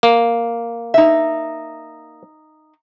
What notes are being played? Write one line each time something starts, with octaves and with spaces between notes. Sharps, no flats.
A#3
D#4 E5